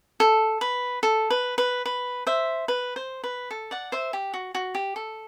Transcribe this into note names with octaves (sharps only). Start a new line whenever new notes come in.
A4
B4
A4
B4
B4
B4
C5 E5
B4
C5
B4
A4
D5 F#5
C5 E5
G4
F#4
F#4
G4
A4